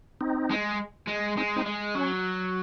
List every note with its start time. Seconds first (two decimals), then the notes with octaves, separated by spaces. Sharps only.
0.21 C4 D#4
0.51 G#3
1.08 G#3
1.37 G#3 C4 D#4
1.56 C4 D#4
1.66 G#3
1.95 F#3 C#4